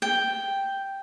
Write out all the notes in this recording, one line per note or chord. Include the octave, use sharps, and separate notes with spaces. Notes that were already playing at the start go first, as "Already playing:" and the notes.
G5